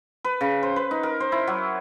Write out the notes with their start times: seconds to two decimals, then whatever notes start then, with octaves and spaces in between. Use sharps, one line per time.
0.24 B4
0.41 C#3
0.63 C5
0.76 B4
0.91 D#4
1.03 A#4
1.20 C5
1.32 E4
1.47 F#3